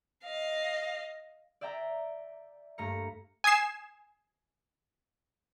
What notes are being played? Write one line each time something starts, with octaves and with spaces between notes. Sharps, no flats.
D#5 F5
D5 E5 G5 A#5
G2 A3 A#3 A#5 C#7
G#5 D#6 G#6 C7 E7